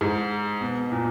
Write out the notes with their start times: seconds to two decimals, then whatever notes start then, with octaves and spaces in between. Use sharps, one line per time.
0.01 G#2
0.61 B2
0.92 A#2